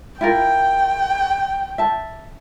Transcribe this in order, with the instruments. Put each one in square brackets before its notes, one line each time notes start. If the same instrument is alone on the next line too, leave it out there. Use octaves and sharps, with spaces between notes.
[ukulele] E4 F4 A#4 [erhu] G5
[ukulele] E5 A5